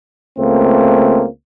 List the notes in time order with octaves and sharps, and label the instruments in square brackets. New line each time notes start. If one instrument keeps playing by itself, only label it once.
[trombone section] C#2 A3 A#3 C4